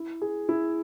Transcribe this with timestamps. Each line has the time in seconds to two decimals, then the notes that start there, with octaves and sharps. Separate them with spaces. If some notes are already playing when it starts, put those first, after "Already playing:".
Already playing: E4
0.22 G#4
0.49 E4